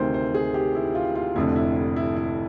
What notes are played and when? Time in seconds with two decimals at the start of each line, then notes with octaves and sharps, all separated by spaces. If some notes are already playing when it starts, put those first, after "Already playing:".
Already playing: D2 C3 D#3 C5
0.14 C5
0.35 G#4
0.54 G4
0.75 E4
0.95 F4
1.15 F4
1.36 F1 F2 D3 E4
1.56 E4
1.76 E4
1.96 E4
2.16 E4